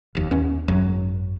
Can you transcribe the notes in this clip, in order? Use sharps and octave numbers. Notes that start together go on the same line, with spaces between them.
F1 D#2
D#2 C#4
G#1 F#2 F#3